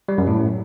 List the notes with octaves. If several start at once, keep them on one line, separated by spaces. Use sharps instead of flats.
G3
F#2
A2